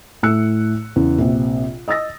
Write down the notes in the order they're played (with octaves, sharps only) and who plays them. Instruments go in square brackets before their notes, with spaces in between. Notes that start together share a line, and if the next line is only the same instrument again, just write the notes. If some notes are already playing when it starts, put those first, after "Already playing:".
[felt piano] A2 A3 E6 F#6 C#7
E2 C#3
A#1 C3
D#5 D#6 E6 A6 A#6